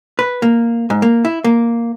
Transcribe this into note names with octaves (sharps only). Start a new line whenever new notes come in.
B4
A#3
G#2
A#3
E4
A#3